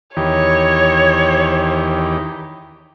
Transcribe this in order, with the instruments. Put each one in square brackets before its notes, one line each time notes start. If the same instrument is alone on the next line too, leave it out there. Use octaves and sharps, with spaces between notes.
[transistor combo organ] E2 D#3 G4 [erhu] C#5